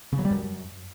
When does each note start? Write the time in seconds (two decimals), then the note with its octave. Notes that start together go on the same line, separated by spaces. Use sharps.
0.12 C#3
0.19 F#3
0.25 G3
0.31 F#2